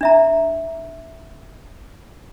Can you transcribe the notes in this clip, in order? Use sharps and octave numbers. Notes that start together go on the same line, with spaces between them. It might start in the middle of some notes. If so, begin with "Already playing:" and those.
D4 E5 A#5